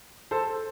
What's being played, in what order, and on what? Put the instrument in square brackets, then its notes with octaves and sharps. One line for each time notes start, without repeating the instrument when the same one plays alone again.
[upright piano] A4 C5